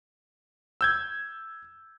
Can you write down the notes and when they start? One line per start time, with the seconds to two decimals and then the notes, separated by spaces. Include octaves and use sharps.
0.81 E6 G6 G#6